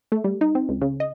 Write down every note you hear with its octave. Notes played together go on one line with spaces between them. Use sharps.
A3
G3
D#4
C4
C#2
C#3
D#5